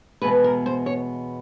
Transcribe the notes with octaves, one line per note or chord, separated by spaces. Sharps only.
E2 B2 G#3 B3 B4
A#4
C5
C#5